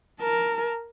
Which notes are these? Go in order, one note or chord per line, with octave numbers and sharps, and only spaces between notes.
A#4 A5